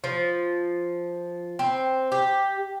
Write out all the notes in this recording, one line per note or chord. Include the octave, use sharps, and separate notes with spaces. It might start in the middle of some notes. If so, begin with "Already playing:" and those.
F3
C4
G4